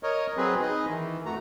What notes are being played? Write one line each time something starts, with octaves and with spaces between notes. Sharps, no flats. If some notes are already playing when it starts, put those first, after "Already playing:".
A#4 C#5 D#5
F#3 C4 G#4 B4
D#4 G#4 B4 D#5
D#3 E3
F2 A3 F#4 A#5